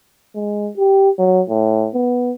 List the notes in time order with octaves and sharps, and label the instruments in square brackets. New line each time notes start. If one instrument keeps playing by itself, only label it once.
[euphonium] G#3
G4
F#3
A2
B3